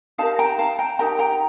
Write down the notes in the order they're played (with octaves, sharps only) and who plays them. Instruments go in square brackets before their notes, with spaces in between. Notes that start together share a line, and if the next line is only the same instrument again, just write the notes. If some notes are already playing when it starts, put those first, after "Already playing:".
[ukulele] D#4 G4 A#4 F5 A5
G5 A#5
F5 A5
G5 A#5
D#4 G4 A#4 G5 A#5
G5 A#5